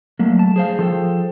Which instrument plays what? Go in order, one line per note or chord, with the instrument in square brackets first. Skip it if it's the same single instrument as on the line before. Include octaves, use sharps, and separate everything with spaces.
[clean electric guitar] F#3 A3 [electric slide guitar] A#3
[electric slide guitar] A5
[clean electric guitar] G#4 C5 F5
[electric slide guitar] F3 A4 G5